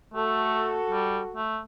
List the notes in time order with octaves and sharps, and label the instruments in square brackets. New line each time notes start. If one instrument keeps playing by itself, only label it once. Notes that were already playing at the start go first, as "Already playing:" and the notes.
[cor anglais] A3 [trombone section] F#4 A4
[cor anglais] G3
A3